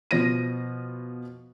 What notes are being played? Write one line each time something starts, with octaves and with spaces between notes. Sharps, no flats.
B2 F3 A#6 D#7